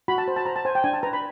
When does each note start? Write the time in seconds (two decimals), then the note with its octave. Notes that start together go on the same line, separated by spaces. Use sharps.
0.08 F#4 B5
0.18 A5
0.28 C5
0.36 A5
0.46 C5 A#5
0.56 A5
0.65 C5 G#5
0.75 G5
0.84 D4 G#5
0.94 A5
1.03 B4 A#5
1.13 B5